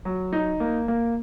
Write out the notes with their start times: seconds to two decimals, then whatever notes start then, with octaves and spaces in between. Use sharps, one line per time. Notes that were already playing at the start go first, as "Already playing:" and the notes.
0.05 F#3
0.33 D#4
0.60 A#3
0.88 A#3